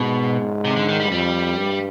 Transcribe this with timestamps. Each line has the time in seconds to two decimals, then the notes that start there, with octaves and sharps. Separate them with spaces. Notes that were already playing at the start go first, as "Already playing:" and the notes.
Already playing: G#2 B2
0.65 C3
0.76 D3
0.89 D#3
1.00 G3
1.12 F2 G3
1.59 G2